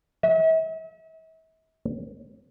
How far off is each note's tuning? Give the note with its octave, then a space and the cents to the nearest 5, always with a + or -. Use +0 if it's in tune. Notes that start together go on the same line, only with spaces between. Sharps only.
E5 -40